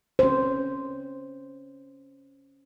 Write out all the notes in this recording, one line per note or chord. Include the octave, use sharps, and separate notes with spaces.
C#4 C5